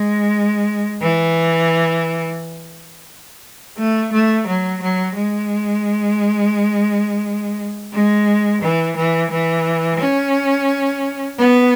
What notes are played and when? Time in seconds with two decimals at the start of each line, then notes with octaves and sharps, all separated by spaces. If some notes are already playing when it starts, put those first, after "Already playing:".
Already playing: G#3
1.01 E3
3.78 A3
4.12 A3
4.47 F#3
4.82 F#3
5.16 G#3
7.93 G#3
8.62 E3
8.96 E3
9.31 E3
10.00 C#4
11.38 B3